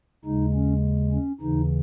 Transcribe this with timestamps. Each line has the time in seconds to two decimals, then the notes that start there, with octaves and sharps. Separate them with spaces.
0.25 D#2 C#3 G#3 D#4
0.54 C#4
1.12 C#4
1.41 D#2 C#3 E3 D#4